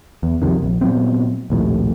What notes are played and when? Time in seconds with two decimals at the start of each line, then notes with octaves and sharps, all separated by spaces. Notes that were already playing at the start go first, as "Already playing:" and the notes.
0.23 E2
0.42 C2 F2 C3 D#3
0.63 A#1
0.81 A#2 F#3 B3 C4
1.50 A#1 D#2 A2 C3